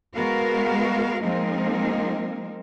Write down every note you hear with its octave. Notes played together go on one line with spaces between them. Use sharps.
G#3 B3 F#4 A#4 F5
F3 G#3 A#3 C4 D#4 A#4